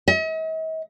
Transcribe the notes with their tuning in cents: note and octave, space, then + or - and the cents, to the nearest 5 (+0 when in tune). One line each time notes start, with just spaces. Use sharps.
D#5 +45